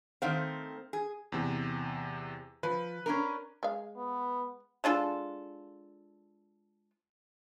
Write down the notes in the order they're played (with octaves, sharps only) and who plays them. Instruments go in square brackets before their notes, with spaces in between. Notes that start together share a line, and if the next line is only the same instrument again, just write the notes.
[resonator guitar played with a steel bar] D#3 A3 C4 [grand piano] C5 F5
[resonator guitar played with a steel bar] G#4
[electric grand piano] E2 C3
[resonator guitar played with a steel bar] F3 [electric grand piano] B4
[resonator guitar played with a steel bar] C#4 D4 A#4
[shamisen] G#3 F5
[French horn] B3
[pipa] G#3 D4 F4 A4